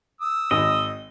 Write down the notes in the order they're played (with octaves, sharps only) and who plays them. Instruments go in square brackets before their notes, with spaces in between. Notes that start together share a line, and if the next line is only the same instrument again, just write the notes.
[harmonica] D#6 E6
[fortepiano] G#1 [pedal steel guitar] D#5